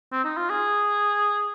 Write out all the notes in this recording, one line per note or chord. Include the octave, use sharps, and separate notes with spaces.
C4
D#4
F4
G#4